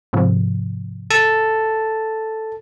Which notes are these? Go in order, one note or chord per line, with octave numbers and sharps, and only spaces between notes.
G#2 C3 F3
A4 A5